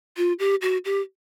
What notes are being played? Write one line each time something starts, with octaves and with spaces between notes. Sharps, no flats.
F4
G4
F#4
G4